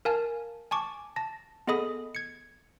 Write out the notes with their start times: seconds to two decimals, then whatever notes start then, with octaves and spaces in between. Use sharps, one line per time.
0.05 A#4 F5 G#5 A5 F6
0.71 G#5 A5 C#6 D6
1.16 A5 A#6
1.67 B3 G#4 A4 D#5 B5 D#6
2.15 G#6 C#7